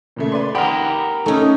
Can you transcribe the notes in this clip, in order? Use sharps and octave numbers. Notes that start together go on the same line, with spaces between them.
A#2 C#3 A3
B4 D5 C6
G4 A#4 F#5 B5 D#6
A3 C#4 D#4 D#6